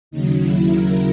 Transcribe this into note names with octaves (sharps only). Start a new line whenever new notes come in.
D#2 C#3 F#3 D#4
E4
A#4